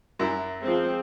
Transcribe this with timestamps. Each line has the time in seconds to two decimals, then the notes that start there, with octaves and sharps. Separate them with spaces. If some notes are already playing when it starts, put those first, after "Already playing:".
0.19 F#2 E4
0.62 F3 G#3 C4